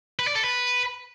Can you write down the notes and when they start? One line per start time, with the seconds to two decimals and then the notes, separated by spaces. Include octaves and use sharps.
0.19 B4
0.27 D5
0.35 A4
0.43 B4